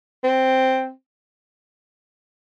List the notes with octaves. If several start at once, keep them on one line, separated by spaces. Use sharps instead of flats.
C4